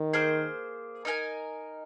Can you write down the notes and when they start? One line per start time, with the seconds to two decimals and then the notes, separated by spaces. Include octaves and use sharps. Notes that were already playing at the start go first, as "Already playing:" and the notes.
Already playing: D#3
0.13 A#3 G#4 C5
1.05 D#4 A#4 G#5